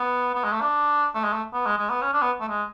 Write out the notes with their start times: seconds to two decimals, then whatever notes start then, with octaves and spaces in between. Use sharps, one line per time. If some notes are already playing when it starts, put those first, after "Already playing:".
Already playing: B3
0.35 B3
0.44 G#3
0.52 A3
0.61 D4
1.15 A3
1.24 G#3
1.33 A3
1.53 B3
1.66 G#3
1.77 G#3
1.90 B3
2.01 C#4
2.13 D4
2.22 B3
2.40 A3
2.49 G#3